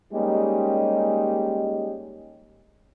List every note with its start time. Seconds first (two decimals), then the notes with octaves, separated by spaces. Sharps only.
0.13 G3 G#3 A#3 C#4 D#4 G4